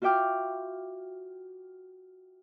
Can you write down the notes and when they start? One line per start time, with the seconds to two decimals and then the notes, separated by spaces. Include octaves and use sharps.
0.02 F4 F#4 E5 G5 D6 F6